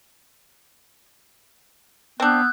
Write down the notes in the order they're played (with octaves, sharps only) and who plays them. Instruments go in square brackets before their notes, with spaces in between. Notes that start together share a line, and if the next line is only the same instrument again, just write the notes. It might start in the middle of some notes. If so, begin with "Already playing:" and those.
[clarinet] B3 [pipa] C4 D4 [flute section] E6 F#6 G6